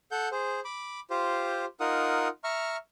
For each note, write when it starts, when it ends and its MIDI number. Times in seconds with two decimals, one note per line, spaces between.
0.11 0.28 69
0.11 0.28 78
0.11 0.28 91
0.32 0.60 68
0.32 0.60 72
0.65 1.00 83
0.65 1.00 86
1.10 1.65 65
1.10 1.65 67
1.10 1.65 72
1.80 2.28 63
1.80 2.28 65
1.80 2.28 70
1.80 2.28 78
1.80 2.28 87
2.44 2.77 76
2.44 2.77 82
2.44 2.77 85
2.44 2.77 89